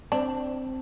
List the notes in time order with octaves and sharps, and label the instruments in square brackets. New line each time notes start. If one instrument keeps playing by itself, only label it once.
[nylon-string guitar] C4 [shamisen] D4